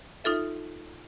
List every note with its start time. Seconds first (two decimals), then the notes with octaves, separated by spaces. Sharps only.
0.24 D#4 F4 A4 E5